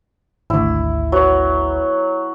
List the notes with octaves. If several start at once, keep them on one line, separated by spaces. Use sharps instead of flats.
G#1 D2 E4
F#3 B3